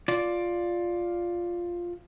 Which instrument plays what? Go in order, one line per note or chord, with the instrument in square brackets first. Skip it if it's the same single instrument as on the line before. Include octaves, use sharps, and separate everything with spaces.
[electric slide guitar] F4 D5